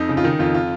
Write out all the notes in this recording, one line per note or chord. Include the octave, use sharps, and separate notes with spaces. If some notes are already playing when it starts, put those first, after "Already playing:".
Already playing: F2 D#4
C#3
F4
D#3 D#4
F2 F4
F4